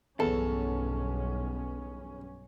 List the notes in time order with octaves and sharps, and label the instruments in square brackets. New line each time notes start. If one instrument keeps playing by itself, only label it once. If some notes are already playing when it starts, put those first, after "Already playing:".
[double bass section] B1 G2 C#4 [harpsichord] E2 [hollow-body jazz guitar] A4